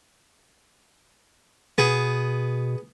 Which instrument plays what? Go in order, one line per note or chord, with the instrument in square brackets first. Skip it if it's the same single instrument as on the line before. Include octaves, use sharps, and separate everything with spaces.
[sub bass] B2 [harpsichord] B3 G#4